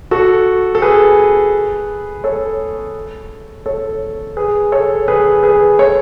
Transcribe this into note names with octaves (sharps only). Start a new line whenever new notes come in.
F#4 A4
A4
G#4 B4
A4 C#5
A4 C#5
G#4 B4
A4 C#5
G#4 B4
G#4 B4
A4 C#5